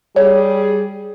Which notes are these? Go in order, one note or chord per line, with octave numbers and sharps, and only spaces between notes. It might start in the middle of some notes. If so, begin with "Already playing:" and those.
G3 G#4 C#5